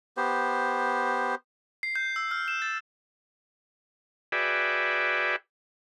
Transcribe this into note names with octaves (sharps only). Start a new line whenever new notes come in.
B3 G4 C5
C7
G6
E6
F6
E7
A6
F#4 G#4 B4 D5 E5 G5